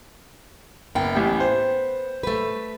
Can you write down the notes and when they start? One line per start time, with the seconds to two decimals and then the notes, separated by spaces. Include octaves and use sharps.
0.95 F#1 B3 G5
1.15 A1 G4
1.40 C5
2.23 A3 B4